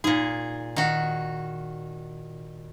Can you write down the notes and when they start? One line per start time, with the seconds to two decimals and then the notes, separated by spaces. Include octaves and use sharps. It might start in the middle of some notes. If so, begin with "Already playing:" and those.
0.04 A#2 D#4 G#4
0.76 D#3 F#4